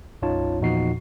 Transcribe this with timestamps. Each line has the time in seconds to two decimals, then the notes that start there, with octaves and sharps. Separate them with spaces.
0.22 B1 F#2 D#4 F4 C#5 A5
0.60 E2 A#2 F3 D#4 F#4 C7